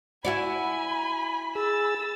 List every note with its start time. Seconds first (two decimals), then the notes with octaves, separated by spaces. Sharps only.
0.25 E4 F#4 D5 G#5 B5
1.55 G#4 E6 A6